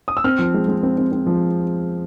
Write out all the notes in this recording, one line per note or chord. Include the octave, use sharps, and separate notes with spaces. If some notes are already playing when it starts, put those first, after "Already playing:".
D#6
E6
C4 F6
F3
G#3
G#3
C4
C4
C4
F3